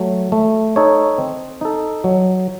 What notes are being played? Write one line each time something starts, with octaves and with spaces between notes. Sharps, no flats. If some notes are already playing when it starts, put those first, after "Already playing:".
Already playing: F#3 A3
A3
D#4 A4 C#5
C4
D#4 A4
F#3